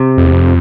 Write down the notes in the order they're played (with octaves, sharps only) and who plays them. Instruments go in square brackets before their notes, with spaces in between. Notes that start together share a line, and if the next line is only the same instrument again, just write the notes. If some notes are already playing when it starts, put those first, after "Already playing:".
Already playing: [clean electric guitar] C3
[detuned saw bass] F2
E2
F2